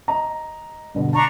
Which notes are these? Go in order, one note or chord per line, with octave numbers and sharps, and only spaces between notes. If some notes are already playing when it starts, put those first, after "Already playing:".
D#5 A#5
G2 B2 D3
D4 A5 A#5 C#6